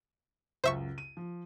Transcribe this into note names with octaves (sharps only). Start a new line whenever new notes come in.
C#2 F#2 C5 E5 C#6
D#7
F3